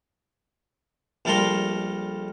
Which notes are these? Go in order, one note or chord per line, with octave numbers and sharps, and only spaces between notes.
A#1 G3 A3 A4 A#4 C6